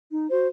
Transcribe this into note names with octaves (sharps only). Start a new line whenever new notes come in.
D#4
F#4 C5